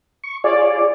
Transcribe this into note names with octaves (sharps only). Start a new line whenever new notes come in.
C#6
F4 G#4 C#5 D5